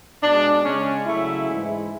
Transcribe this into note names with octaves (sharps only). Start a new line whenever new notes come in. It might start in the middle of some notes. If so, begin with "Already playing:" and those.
B2 G#3 D4
C#3 G#3 C#4
C#3 F#3 A3 E4
G#2 E3 G#3